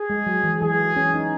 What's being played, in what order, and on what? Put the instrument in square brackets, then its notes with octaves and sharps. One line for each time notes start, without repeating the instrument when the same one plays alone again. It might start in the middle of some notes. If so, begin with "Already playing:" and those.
Already playing: [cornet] G#4
[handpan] G#3
F#3
E3
[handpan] E3 [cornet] G#4
[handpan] C#4
D#4